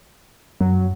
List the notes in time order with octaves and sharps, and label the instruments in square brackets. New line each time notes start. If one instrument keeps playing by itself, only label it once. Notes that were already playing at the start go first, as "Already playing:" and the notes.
[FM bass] F#2 [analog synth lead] F#3